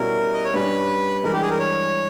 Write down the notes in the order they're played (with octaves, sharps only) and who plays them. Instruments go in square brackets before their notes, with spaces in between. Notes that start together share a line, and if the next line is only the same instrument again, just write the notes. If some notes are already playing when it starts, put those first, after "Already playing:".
Already playing: [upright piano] B2 G3 C#4 E4 [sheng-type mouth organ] A#4
[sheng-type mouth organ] D#5
C#5
[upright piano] G2 G3 C#4 [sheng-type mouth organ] B4
[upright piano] G2 E3 G#3 [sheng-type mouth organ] A#4
[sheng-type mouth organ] G4
G#4
A#4
C#5